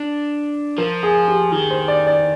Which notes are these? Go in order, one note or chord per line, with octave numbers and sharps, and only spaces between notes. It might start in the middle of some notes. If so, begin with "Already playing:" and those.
Already playing: D4
F3 A#4
G#4
G4
D#3 G#4
C5
D5
D5